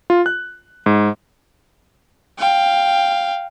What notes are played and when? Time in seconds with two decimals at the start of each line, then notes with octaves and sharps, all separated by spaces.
0.10 F4
0.26 F#6
0.86 G#2
2.39 F5 G5